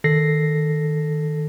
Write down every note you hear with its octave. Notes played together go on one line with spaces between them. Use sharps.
D#3 A4 A#6 C7